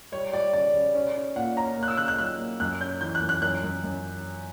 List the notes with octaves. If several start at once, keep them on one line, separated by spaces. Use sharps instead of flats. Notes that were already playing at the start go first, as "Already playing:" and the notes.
G3 C#5
G3 D5
C#3 D5
C#3
C#4
C#4
A#2 F#5
C#4 A#5
A#3
F#6
E6
C#3 F#6
F#6
F#3 F#6
A#3
F#2 F#6
C#4 G6
E3 G6
F#6
F#2
F#6
F#2 F#6
F#2
F#2